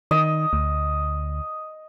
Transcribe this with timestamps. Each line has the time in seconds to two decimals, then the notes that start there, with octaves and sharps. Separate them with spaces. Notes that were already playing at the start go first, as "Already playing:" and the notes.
0.11 D#3 D#5
0.53 D2